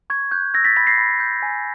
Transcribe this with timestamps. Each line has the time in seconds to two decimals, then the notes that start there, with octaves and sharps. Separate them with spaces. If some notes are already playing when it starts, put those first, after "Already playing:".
0.10 C#6 G#6
0.32 F#6 G6
0.54 E6 G#6 A#6
0.64 A6 B6
0.76 B5 A6 B6
0.87 A#6 C7
0.98 B5
1.20 G6
1.42 G#5